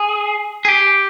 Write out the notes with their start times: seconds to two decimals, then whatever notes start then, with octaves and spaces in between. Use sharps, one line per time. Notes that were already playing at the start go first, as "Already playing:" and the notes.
Already playing: G#4
0.65 G#4
0.68 G4